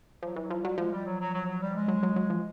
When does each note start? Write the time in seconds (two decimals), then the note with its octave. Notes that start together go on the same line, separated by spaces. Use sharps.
0.22 F3 F#3
0.36 E3
0.41 F#3
0.50 F3
0.59 G3
0.65 F#3
0.78 F3 G#3
0.92 G3
1.06 F#3
1.19 F#3
1.33 F#3
1.47 F#3
1.61 G3
1.75 G#3
1.88 F#3
2.03 F#3
2.16 F#3
2.30 F3